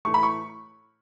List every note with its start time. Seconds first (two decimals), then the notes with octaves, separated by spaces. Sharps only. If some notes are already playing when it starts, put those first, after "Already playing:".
0.05 A2 E3 A3 C#6
0.14 B5
0.23 C#6